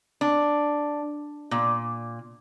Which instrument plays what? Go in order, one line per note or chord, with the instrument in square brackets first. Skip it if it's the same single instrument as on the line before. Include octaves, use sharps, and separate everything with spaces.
[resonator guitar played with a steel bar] D4
A#2